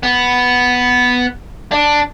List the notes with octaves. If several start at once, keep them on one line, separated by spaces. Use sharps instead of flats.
B3
D4